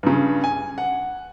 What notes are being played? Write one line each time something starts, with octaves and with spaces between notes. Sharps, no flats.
G2 C#3
G#5
F#5